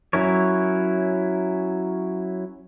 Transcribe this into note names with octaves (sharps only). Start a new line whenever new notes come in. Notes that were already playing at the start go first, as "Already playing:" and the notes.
F#3 C#4 E4 A#4 C#5